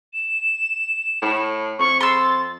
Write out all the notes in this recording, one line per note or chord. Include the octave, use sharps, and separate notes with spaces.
E7
A2
F2 C#6
C6 E6 A6